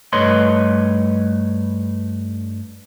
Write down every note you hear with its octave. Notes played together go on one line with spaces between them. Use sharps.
G2 A3 B4 C#5 D#5 C6